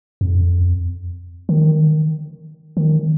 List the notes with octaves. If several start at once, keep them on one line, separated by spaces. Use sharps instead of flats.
F2
D#3
D#3